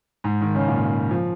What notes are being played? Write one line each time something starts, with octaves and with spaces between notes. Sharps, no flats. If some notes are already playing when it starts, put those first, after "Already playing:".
G#2
D#3
C#3
A#2
F3